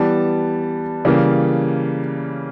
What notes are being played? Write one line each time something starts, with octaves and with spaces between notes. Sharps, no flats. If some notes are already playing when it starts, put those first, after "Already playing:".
Already playing: E3 G3 B3 A5
C#3 E3 G3 A#3